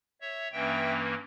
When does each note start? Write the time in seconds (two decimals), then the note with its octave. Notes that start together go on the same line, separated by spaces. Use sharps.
0.21 C#5 E5
0.52 G2 E3 A#3 C#4 E5 G5